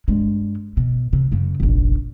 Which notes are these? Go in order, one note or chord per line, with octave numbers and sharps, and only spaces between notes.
G2 G#3
B2
C3
F#2 C#3
F1 A#1